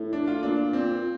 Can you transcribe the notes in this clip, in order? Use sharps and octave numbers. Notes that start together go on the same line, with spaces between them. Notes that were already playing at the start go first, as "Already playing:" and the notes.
Already playing: A2
D4
F4
A#2 D4
C4